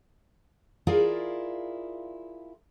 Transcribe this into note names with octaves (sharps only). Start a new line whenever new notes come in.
E4 F4 G#4 A#4 D5 F5